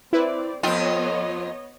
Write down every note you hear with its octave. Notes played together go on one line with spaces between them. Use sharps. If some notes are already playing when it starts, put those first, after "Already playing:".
C4 E4 B4 D5
F2 B3 F4 C#5 D#5 G5